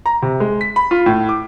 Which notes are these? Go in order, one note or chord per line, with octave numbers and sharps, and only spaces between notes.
A#5
C3
G#3
B6
B5
F4
A2
D6